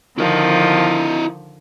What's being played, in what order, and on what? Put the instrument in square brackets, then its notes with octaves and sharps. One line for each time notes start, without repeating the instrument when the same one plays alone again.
[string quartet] D3 D#3 F3 [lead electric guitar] E4 D#5